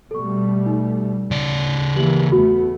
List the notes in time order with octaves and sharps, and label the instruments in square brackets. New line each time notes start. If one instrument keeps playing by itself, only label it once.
[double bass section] B2 G3 A3 [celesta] A4 C#6
[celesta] D#4
[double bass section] D2 [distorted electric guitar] C#3 D5
[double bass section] E3 A#3 [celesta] G4 F#7
[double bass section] E2 A3 B3 [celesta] F#4